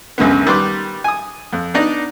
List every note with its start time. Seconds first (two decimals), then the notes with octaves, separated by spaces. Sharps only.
0.18 C#2 F#2 D3 B3
0.46 D#3 G3 B4 C6 D6
1.04 G#5 D#6
1.53 F2
1.74 B3 D4 D#4 D5 D#5